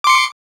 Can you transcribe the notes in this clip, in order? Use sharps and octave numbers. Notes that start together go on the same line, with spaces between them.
C6 D6 C#7